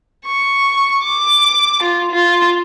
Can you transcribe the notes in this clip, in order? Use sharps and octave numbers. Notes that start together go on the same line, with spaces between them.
C#6
D6
F4
F4